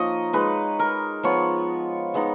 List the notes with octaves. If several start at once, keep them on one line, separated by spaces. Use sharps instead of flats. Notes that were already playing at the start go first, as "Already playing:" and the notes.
Already playing: F3 A#3 D#4 C#5 D#5
G#3 D#4 B4
A#4
F3 B3 F4 C#5
G#3 B3 D#4